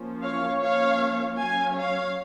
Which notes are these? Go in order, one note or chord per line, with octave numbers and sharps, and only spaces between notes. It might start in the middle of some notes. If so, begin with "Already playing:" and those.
Already playing: F3 A#3 C#4
C#5 F5
F3 A#3 C#4 C#5 F5
F#3 C#4 F5 G#5
C#5 F5